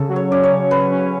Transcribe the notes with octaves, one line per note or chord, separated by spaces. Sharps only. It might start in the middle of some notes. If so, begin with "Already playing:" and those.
Already playing: C#3 A4
F#3
C#5
C#4 D5
C#5
C#3
C#4 B4
C#4